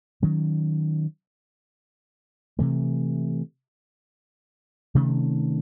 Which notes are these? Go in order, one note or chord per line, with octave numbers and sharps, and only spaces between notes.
D#3 F#3 C#4
C3 E3 A3
C3 D#3 A3 C#4